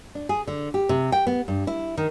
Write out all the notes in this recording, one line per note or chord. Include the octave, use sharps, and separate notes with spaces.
D4
G#4
D3
G4
C3
G5
B3
G2
E4
D#3